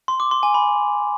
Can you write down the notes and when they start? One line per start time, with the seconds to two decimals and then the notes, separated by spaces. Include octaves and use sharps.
0.08 C6
0.20 D6
0.31 C6
0.43 G#5
0.54 B5